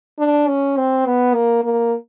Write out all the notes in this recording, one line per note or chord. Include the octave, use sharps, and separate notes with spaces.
D4
C#4
C4
B3
A#3
A#3